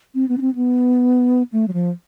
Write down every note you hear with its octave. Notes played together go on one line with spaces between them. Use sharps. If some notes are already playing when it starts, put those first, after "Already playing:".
C4
B3
C#4
C4
B3
A3
F#3
F3